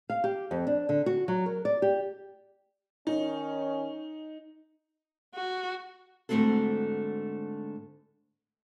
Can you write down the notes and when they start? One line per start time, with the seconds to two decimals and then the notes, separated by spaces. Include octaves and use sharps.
0.10 F5
0.24 G4
0.51 F2
0.67 D4
0.89 D3
1.06 F#4
1.28 F#3
1.46 A#4
1.65 D5
1.82 G4
3.07 D#3 C#4 D#4
5.35 F#4
6.29 G#2 D3 A3 C4 F#4 A4